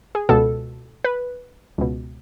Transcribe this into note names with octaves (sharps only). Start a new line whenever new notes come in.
G#4
C#2 B2 A4
B4
C#2 B2